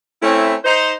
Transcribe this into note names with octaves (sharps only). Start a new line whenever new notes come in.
A3 C4 C#4 E4
D#4 C5